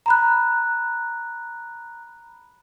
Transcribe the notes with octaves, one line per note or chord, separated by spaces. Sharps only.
A#5 B5 F#6